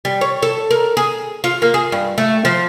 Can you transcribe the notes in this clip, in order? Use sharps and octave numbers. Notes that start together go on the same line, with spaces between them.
G3
C#5
A4
A#4
G#4
F4
A#3
G#4
G2
A3
F3